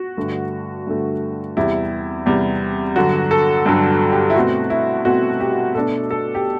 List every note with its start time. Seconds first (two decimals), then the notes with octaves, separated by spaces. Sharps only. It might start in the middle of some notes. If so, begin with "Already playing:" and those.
Already playing: F#4
0.17 G2 D3 A3
0.87 G2 D3 A3
1.57 E2 C3 G3 E4
2.26 E2 C3 G3
2.96 G2 D3 F#3 F#4
3.31 A4
3.66 G2 D3 F#3
4.12 G4
4.30 E4
4.36 B2 A3 C4 F#4
4.70 E4
5.05 B2 A3 C4 F#4
5.40 G4
5.75 B2 A3 D4 A4
6.11 A4
6.35 G4